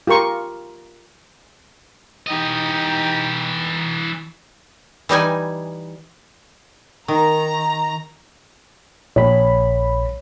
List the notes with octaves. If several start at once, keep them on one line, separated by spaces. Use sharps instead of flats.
F4 G4 A#4 C#6
E3 D#4 G4 D#5
E3 G3 D#4 G#5
D#3 A#5
A#1 C#5 B5